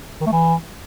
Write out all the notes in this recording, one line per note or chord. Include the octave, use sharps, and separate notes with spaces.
D#3
A3
E3